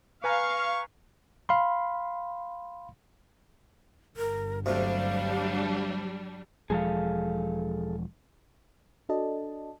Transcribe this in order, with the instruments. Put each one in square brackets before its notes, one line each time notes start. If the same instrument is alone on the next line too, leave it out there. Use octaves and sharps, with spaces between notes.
[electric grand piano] B4 G#5 A#5 [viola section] F5 [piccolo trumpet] C#6
[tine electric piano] F5 B5 C6
[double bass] G1 [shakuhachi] A#4
[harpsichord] D2 C3 [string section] F#3 G3 D4 [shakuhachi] F5
[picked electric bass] E1 F3 G#3 [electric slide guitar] G#4 A4 F5
[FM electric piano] D4 F#4 A4 D5 D#5 A5